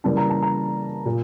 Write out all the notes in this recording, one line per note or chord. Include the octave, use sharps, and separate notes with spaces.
C#3 E3 G3 A#3 A5
A#5
A5
A#5
A#2